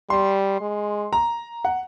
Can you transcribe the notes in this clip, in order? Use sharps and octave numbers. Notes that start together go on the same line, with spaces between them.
G3 C6
G#3
A#5
F#5